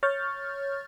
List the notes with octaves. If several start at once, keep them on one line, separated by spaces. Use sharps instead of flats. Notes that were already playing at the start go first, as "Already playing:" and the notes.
C#5 C#6 F6 G6 A6